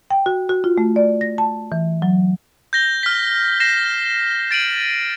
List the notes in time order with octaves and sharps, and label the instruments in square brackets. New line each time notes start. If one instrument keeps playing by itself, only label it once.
[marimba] G5
F#4
F#4
F4
A3
D5
A#6
A5
E3
F#3
[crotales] G6 A#6 G7
F6 B6
A#6 C7 E7
A6 D7 D#7 F#7